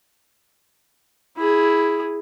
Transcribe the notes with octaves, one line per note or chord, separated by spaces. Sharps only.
E4 G#4